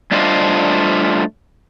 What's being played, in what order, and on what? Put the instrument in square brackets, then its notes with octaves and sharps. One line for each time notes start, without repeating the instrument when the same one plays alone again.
[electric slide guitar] G3 A3 D4 F4 C5 D#5